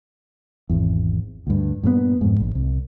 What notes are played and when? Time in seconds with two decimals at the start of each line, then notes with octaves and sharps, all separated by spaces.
0.69 G#1 E2
1.47 D2 G2
1.83 G2 A#2 F3 B3
2.21 F2 G#2
2.40 A#1
2.55 C2